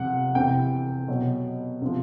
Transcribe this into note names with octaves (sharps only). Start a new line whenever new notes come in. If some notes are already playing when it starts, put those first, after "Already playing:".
Already playing: C3 F3 F#5
C3 E3 G5
B2 F#3
C3 F3